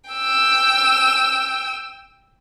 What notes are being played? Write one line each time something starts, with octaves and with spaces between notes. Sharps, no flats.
G5 E6